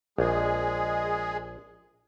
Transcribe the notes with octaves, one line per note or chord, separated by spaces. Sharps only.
A#1 G#3 G#4